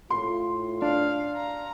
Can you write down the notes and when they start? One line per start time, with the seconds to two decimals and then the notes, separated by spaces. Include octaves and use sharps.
0.10 A2 F4 C6
0.82 D4 F5
1.36 A#5